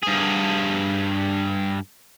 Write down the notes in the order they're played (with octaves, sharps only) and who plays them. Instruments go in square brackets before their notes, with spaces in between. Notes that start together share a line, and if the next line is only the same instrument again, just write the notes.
[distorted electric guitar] G2 G#4